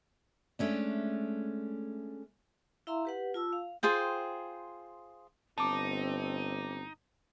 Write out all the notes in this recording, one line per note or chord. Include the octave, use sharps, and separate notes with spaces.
G#3 A3 C#4 D4
E4 E5 F5 A#5 C6
G4 B4 F#5
F4 A5 E6
F5
F4 G#4 C5 G5
G1 C4 D#4 A5 D6